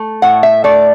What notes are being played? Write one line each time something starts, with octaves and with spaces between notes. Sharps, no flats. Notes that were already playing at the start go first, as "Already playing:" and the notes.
Already playing: A3
A2 F#5
E5
A3 D5